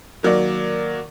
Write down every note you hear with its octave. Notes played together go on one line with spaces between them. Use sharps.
D#3 F#3 A#3 D5